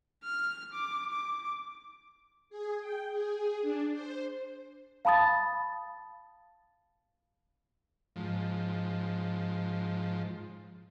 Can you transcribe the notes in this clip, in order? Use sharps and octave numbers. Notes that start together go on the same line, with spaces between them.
F6
D6
D6
G#4
G5
G#4
D4
C5
F5 A5 B5 D#6 A6
G#2 F3